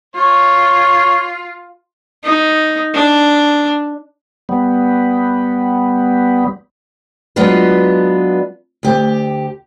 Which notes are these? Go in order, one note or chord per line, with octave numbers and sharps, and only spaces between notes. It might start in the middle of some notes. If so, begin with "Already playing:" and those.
F4 C#5
D#4
D4
G3 B3
F#3 G#3 B3 D4 F4 B4
D2 G4